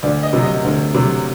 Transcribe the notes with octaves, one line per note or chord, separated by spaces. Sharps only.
D2 D5
D#5
C3 F#3
D#5
D2
C3 F#3